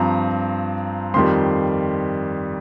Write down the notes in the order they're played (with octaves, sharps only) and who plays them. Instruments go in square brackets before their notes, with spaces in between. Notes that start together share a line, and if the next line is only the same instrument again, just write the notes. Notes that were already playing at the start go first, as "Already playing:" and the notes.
Already playing: [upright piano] G2 F3 C4 A#5
F2 D#3 G3 C6